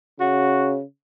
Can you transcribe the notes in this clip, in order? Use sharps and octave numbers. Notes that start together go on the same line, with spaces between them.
C#3 F#4